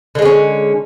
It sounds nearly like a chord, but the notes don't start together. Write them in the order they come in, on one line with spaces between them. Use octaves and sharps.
D3 G#3 B3 C#4